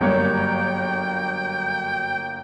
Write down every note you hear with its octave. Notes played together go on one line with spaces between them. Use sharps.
G1 F#2 F#3 G3 A#3 C#5 G5